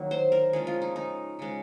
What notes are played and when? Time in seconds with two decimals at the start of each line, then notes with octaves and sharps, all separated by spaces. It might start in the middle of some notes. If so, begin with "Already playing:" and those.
Already playing: D#3 F#3 A#3
0.11 C5
0.32 A#4
0.53 C#3 F3 G#3 G#4
0.67 F4
0.82 D#4
0.96 D#4
1.39 C#3 G#3